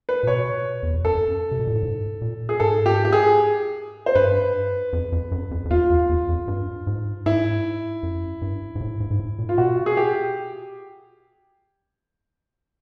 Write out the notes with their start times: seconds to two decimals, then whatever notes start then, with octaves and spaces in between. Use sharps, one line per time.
0.09 B4
0.23 A#2
0.27 B2 C#5
0.83 E2
0.94 F2
1.05 F#2 A4
1.52 C3
1.60 B2
1.67 A#2
1.75 A2
1.83 G#2
2.22 A#2
2.49 G#4
2.60 G#2 A4
2.86 G4
3.05 G4
3.13 G#4
4.06 C5
4.15 G2 B4
4.93 F2
5.12 F2
5.32 F#2
5.51 F2
5.65 F2
5.71 E2 F4
5.90 E2
6.09 E2
6.29 F2
6.48 G2
6.87 G#2
7.26 G#2 E4
8.03 F#2
8.42 G2
8.75 G#2
8.81 A2
9.00 G#2
9.11 G#2
9.20 A2
9.39 A#2
9.49 F4
9.58 B2 F#4
9.86 G#4
9.97 G4